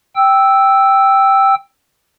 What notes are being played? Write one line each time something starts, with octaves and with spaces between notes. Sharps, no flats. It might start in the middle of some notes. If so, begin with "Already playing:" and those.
G5 E6